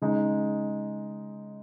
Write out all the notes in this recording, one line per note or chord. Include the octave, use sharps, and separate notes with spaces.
C#3 G#3 D#4